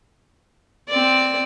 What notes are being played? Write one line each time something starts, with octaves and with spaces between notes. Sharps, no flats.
C4 D5